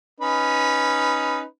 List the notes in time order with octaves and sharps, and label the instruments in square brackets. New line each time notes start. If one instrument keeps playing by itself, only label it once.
[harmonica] C#4 D#4 B4